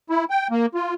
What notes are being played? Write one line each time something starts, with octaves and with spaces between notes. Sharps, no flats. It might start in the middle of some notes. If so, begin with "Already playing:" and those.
E4
G5
A#3
F4